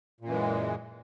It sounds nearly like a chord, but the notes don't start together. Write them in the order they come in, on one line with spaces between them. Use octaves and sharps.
A#2 F#2 E3 G#3